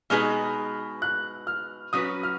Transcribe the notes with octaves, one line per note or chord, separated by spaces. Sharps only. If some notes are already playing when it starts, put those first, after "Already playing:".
B2 G#3 D#4 G#4 B4 F6
F#6
F6
F#3 C#4 F#4 B4 D#6
F6